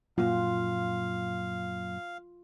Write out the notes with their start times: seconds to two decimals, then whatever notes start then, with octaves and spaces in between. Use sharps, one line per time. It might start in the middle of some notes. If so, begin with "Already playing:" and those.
0.18 F#2 A#2 F4 F5